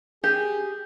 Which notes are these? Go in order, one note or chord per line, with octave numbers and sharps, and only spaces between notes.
G4 G#4